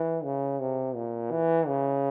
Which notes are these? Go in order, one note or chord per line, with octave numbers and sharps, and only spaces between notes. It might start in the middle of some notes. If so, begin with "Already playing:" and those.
Already playing: E3
C#3
C3
A#2
E3
C#3